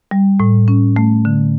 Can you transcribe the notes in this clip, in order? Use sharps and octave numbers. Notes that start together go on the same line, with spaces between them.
G3
A2
C#4
A3
D3